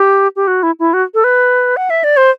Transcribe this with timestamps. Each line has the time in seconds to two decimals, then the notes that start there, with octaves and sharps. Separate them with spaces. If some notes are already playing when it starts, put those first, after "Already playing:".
Already playing: G4
0.36 G4
0.47 F#4
0.63 E4
0.79 E4
0.94 F#4
1.14 A4
1.24 B4
1.77 F#5
1.90 E5
2.04 D5
2.17 C5